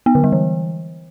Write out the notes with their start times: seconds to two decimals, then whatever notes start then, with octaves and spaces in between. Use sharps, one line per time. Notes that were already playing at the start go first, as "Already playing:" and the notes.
0.06 B3
0.15 D3
0.24 G3
0.32 E3